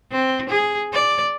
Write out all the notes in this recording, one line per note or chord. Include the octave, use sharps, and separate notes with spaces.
C4
G#4
D5